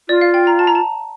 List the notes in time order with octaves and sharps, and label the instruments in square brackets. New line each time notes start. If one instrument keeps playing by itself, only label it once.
[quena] F4 [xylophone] D5
[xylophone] F5
G5
A#5
A5
A#5
A5